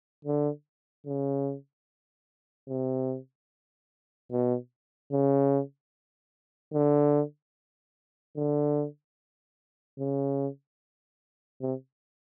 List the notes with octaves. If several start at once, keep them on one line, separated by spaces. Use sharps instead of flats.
D3
C#3
C3
B2
C#3
D3
D3
C#3
C3